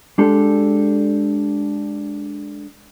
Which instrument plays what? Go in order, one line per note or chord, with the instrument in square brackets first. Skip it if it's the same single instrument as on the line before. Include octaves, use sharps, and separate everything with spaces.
[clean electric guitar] G#3 D4 G4 A4